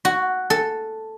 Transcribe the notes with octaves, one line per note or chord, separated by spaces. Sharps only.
F#4
A4